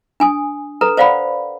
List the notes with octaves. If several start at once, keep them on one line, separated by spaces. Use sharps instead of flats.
D4 G#5 D#6
A4 B4 A#5
C5 D5 F5 F#5 B5